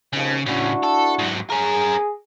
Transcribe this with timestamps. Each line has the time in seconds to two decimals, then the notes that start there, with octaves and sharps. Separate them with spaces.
0.13 G#1 D#2 C#3 F3
0.46 A2 C#3 D4 E4 F#4
0.83 A4
1.19 G#2 F#3
1.50 C#4 G#4 A#4